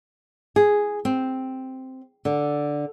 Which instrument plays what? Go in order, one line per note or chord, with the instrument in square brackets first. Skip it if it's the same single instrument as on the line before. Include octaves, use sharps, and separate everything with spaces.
[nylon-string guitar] G#4
C4
D3